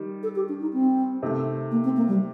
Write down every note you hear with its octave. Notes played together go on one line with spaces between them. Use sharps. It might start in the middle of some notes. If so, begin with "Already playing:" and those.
Already playing: D#3 G3
A4
G4
D4
D#4
C4
C3 D#3 A3
A#3
C4
A#3
G3